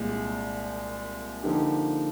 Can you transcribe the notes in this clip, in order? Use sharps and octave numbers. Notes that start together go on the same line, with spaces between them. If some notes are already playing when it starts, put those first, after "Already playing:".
Already playing: C2 A#2 G#3
D3 F3 A#3 D#4 G4